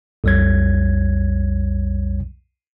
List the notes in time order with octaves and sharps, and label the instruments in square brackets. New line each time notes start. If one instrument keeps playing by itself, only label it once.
[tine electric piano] B1 F2 G3 C#5 G#6